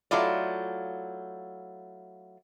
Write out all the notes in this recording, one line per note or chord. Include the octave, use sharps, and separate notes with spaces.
F#3 A3 E4 F4 D5